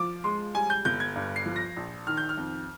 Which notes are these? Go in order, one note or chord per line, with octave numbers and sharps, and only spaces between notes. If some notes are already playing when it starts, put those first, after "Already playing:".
Already playing: F3 D6
G#3 C6
G3 G#5
G6
G1 G6
G#6
G2
C7
F3
A#6
A#1
D#3 F6
G6
F6
F2